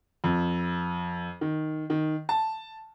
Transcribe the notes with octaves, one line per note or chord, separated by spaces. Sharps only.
F2
D#3
D#3
A5